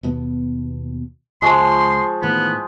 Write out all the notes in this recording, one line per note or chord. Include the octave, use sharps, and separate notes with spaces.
D#2 B2 B3
C#2 F3 G#3 C6 C#6
A2 D#3 E3 B3